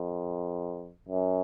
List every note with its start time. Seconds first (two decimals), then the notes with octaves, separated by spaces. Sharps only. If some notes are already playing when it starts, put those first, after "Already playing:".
Already playing: F2
1.09 F#2